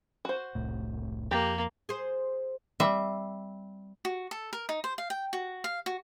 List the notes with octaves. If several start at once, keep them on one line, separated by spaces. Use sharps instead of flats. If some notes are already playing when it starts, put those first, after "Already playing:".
F#4 C5
E1 C2 A2
F2 A#3 G4
G#4 C5
G3 C4 E5
F#4
A4
A#4
D#4
C5
F5
G5
F#4
F5
F#4